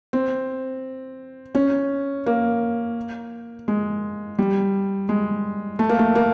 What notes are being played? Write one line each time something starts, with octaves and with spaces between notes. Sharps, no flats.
C4
C#4
A#3
G#3
G3
G#3
A3
A#3
A3
A#3